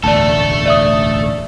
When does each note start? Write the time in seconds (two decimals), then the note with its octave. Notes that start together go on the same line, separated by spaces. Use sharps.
0.04 E1 A1 D2 A3 A4 D5 A5
0.66 D5 E5 D#6